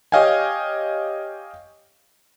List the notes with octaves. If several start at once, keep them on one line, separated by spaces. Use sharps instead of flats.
G4 C#5 D#5 F5 G5 G#5